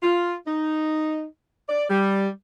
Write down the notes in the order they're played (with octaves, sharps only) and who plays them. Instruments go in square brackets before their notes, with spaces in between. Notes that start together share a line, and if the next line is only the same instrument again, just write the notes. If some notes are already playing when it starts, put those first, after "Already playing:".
[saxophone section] F4
D#4
D5
G3